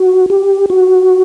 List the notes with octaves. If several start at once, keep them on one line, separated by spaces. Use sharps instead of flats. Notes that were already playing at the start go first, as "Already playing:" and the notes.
Already playing: F#4
G4
F#4